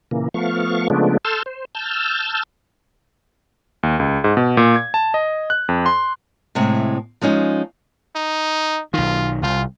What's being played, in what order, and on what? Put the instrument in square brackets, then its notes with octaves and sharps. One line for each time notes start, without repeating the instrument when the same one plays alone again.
[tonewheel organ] A#2 C#3 E3 A#3
F3 A3 B3 F5 C#6
C#3 F3 G#3 A3 B3 D4
A4 A5 C6 E6 F6 G6
C5
A5 E6 F6 G6
[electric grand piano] D#2
C#2
G#2
B2
A#2
G#6
A5
D#5
F#6
F2
C6
[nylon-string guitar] A2 C3 G#3
F3 G#3 C#4 D#4
[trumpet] D#4
[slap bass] B1 D#3 [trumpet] F4
[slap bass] C2 [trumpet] F4